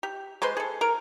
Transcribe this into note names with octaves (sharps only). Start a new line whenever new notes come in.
G4
G#3 B4 C5 C6
G#4 A4
A#4